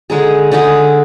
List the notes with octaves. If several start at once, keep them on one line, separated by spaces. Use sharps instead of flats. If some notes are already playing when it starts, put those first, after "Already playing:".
D3 G#3 D#4 G#4
D3 G#3 D#4 G#4